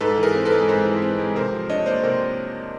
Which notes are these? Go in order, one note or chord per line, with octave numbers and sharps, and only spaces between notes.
G#2 A4 B4
E3
G#4 A#4
C4
A4 B4
G#3
G#2 A#4 C5
E3
C4
G#3
C3 A#4 C5
F3
D4 C#5 D#5
A#3 C5 D5
C3 A#4 C5